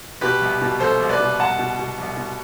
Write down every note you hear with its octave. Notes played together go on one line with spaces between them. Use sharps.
B2 G4 B4
C2
B2
C2 A4 C5
C2
B4 D5
B2
C2 F#5 A5
B2
B2
C2
B2